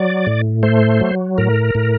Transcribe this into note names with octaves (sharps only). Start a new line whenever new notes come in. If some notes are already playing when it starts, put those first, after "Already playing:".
Already playing: F#3 D5
A2
A3 C5
F#3
A2 A#4
A2